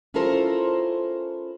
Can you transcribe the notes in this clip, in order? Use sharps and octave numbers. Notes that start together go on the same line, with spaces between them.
C#4 E4 F4 A4 A#4 C5